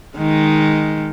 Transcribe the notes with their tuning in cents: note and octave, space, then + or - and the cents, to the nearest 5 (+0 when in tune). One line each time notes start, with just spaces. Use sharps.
D#3 +0 G#3 +0